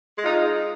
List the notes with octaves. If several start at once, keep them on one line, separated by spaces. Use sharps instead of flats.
G#3 D#4 F4